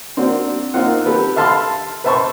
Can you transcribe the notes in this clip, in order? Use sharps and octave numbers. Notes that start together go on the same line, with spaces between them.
A#3 C4 D4 F#4
A#3 C4 D#4 F4 F#5
G4 A4 B4
E5 F5 A5 B5 C6 F6
B4 C5 E5 A5 C6 C#6